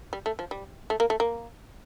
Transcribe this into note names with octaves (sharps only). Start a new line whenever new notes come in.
G3
A3
F3
G3
A3
A#3
A3
A#3